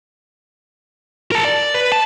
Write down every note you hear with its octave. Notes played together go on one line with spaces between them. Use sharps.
A#4 A5
D5
B4
A5